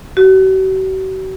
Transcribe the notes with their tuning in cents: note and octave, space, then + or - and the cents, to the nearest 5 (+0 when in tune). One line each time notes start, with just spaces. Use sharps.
F#4 +45